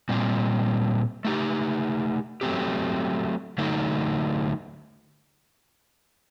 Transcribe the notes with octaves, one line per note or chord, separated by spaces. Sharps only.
A#2 G3 C4
A3 D#4 G4
F#3 A3 C4 G4
D3 F#3 A3 D#4 A4